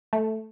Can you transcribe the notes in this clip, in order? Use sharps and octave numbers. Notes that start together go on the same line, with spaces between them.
A3